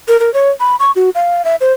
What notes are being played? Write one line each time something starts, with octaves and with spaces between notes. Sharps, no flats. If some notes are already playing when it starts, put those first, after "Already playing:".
A#4
A#4
C#5
B5
C#6
F#4
F5
E5
C5